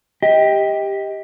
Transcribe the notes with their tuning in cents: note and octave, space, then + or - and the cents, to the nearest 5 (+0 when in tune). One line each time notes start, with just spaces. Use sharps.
G4 +10 D#5 +25